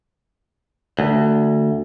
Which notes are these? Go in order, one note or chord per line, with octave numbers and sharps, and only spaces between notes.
D2